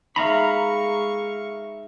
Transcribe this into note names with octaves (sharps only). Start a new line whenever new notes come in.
G#3 D#4 E5 F5 A#5 B5 C#6